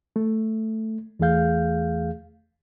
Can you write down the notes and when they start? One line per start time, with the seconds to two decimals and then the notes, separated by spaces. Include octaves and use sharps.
0.16 A3
1.19 E2 E3 A3 G#4 F5 G6